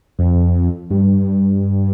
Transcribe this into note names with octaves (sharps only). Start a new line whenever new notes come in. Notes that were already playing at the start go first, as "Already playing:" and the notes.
F2
G2